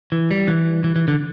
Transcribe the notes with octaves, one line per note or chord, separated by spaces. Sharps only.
E3
G3
E3
E3
E3
D3